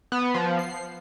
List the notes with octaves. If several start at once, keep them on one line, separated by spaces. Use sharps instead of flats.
B3
F3
C7